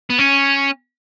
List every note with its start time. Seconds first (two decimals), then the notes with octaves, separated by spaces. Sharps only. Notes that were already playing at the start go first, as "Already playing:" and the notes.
0.10 B3
0.19 C#4